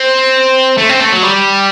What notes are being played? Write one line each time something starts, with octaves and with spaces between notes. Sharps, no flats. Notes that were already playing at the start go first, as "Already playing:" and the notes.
Already playing: C4
A3
C4
A3
F#3
G3